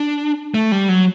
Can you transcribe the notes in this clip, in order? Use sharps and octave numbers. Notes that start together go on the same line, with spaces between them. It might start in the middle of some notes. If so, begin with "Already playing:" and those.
Already playing: D4
A3
G3
F#3